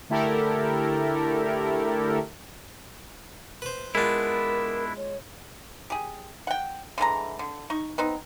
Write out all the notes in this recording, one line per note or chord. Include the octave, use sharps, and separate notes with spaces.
D3 A3 E4 G4 A4 A#4
B4 C5
G#3 B3 D4 E4 F4 A#4
C#5
G4 G#4
F#5 G5
D3 E3 G#3 A#5
D3
D#4 C#6
B3 C4 D#4